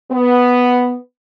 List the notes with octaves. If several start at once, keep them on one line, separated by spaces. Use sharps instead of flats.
B3